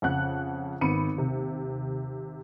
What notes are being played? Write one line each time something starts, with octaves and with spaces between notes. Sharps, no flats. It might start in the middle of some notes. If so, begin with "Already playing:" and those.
F2 C#3 F#5 F#6
G#1 B3 B5 C#7 D#7
D#2 C3